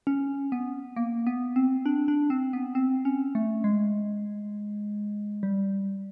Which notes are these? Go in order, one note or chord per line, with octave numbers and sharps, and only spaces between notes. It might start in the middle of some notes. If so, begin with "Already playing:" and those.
C#4
B3
A#3
B3
C4
D4
D4
C4
B3
C4
C#4
A3
G#3
G3